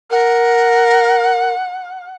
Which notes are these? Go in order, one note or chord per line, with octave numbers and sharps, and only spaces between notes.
A#4 F#5